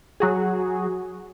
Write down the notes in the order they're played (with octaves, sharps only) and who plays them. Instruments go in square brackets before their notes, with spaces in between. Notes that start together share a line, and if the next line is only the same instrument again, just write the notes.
[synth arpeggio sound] F#3 F#4 G#4